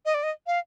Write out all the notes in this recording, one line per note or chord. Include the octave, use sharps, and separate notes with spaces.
D#5
D5
D#5
F5